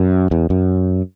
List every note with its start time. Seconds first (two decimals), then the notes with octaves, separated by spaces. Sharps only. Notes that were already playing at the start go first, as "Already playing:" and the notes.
Already playing: F#2
0.31 E2
0.50 F#2